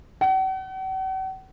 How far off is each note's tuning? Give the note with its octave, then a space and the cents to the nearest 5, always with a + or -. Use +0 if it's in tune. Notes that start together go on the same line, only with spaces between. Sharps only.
F#5 +45